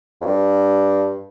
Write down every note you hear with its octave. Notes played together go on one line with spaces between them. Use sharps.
F2
G2